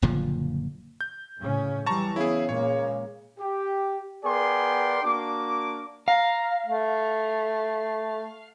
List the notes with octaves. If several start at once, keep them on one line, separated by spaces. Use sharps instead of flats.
F#1 A#2 D3 F3
G6
A2 C#3 C#4
E3 F#3 G3 A5 A#5 C#6
C#3 B3 E4 G#4
A#2 G#3 A#3 C#5
G4
B3 G#4 A#4 D5 G5 C6
A#3 D4 F#4 D6
F5 A#5
A3